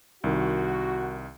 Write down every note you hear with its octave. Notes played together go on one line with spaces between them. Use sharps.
C2 D#3 F#4